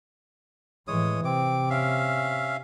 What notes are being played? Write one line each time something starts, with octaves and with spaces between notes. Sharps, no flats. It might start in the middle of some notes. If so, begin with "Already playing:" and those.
A2 E3 G#3 C#5 D#6
C3 C4 D6
C#4 E5 F5